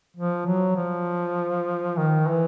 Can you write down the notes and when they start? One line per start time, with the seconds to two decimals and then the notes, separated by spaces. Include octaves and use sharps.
0.17 F3
0.46 F#3
0.76 F3
1.97 D#3
2.28 E3